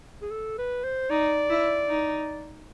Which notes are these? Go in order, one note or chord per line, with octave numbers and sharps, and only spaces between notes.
G#4
A4
B4
C5
D#4 D5
E4
D#4